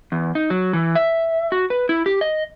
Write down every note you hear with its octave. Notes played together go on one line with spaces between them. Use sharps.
E2
D#4
F#3
E3
E5
F#4
B4
E4
G4
D#5